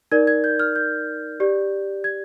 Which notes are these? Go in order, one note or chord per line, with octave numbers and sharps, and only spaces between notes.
D#4 A#4 D5 G#6
G#6
G6
F6
G6
G4 D5
G#6